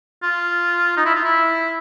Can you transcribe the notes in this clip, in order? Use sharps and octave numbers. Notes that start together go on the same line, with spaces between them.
F4
D#4
E4
F4
E4